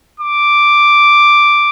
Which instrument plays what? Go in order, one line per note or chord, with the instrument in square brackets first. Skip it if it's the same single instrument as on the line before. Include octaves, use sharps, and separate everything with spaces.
[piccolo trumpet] D6